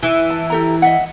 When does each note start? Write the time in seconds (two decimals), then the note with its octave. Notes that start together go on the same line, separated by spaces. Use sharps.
0.03 E3
0.30 A5
0.50 G4 A4 A#5
0.82 D#5 E5 F#5